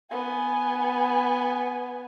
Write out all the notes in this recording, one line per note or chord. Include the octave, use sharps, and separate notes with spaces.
B3 G#5